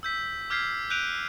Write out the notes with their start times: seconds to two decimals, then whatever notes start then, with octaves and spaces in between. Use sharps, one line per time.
0.03 E6 G6 B6
0.50 D6 F6 G6 G#6 B6 C7
0.90 F#6 G6 D7 D#7 F7